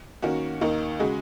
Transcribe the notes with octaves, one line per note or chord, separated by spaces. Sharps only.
D#3 A#3 C#4 F#4
D#2 D#3 A#3 D#4
C#3 G#3 F#4